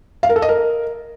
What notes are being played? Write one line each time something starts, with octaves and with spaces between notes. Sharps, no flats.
F5
A#4
A4
D#5
A#4